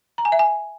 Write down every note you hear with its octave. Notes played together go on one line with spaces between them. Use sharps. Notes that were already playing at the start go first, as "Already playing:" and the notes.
A#5
G#5
E5
G#5